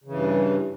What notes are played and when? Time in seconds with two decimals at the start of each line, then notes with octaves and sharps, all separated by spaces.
0.04 C#3
0.08 E3
0.12 G2